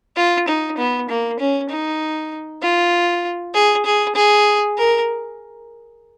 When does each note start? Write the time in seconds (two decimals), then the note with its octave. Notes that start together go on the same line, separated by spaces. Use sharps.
0.16 F4
0.48 D#4
0.78 B3
1.10 A#3
1.40 C#4
1.70 D#4
2.62 F4
3.54 G#4
3.86 G#4
4.15 G#4
4.78 A#4